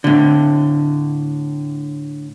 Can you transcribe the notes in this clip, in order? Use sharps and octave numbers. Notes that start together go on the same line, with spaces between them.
A2 D3